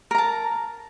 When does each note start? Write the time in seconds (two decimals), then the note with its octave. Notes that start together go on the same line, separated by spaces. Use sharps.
0.11 A#4
0.15 A#5
0.18 A5